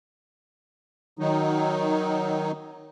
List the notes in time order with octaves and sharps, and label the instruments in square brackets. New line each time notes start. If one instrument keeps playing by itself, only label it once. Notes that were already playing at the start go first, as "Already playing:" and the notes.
[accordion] D#3 F#3 D#4